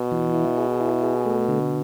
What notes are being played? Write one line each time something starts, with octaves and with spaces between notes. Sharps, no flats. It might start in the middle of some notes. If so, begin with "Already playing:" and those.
Already playing: B2
E3
E4
G#4
E4
G#4
A3
D3